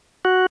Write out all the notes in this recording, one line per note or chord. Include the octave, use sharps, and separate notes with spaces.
F#4